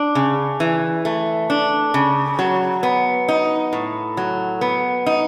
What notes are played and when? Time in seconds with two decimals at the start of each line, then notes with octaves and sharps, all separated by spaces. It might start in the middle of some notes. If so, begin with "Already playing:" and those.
Already playing: D4
0.15 C#3
0.60 E3
1.05 A3
1.50 D4
1.94 C#3
2.39 F#3
2.83 B3
3.28 D#4
3.73 A2
4.17 F#3
4.61 B3
5.06 D#4